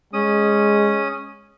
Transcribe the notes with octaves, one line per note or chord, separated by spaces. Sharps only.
G#3 C#4 D#6